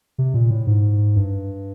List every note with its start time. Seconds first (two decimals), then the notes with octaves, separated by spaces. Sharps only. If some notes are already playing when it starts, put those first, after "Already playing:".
0.18 C3
0.34 A#2
0.51 A2
0.67 G#2
1.16 G2